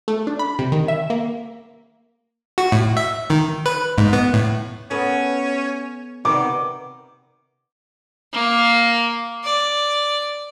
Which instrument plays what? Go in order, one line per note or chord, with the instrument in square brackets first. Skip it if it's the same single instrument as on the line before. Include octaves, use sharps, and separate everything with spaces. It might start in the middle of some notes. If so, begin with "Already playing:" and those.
[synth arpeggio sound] A3
D4
B5
C3
D#3
E5
A#3
[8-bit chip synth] F#4
A2
E5
D#3
B4
G#2
B3
A2
[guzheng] A3 B3 [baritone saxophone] C#4
[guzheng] C3 B3 [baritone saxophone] D#3 [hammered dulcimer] D6
[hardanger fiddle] A#3
D5